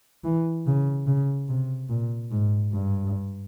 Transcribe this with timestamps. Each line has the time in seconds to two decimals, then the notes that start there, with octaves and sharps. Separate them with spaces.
0.24 E3
0.66 C#3
1.06 C#3
1.49 C3
1.89 A#2
2.30 G#2
2.72 G2